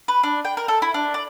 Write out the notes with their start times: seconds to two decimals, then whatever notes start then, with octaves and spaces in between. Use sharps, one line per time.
0.08 B4
0.23 D4
0.45 G5
0.57 A#4
0.68 A4
0.82 E4
0.94 D4
1.14 D5